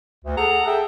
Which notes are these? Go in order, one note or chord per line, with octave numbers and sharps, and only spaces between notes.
D2
G#4 A4 F#5 A#5
G#4 A4 E5 G5